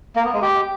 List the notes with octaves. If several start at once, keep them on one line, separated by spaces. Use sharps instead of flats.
A#3
B3
G#3
G4